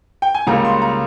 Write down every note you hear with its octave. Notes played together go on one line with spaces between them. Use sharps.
G5
G#5
C#2 C#3 G3 A#3 A#5
C6
A#5